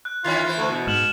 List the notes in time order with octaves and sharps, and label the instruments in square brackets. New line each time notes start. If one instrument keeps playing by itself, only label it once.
[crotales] F#6
[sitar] D#3 E3 C#4 [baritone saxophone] F4
[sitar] E3 C5
[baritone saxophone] D2
B2
[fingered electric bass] G#2 [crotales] F6 E7 F#7